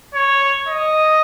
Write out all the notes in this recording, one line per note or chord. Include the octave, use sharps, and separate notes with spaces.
C#5
D#5